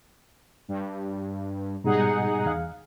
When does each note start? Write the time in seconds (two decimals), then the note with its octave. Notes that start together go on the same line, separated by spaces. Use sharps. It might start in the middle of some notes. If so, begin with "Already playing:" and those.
0.68 G2
1.84 G#2 B2 G3 D#4 G#4 F#5
2.46 E2 F5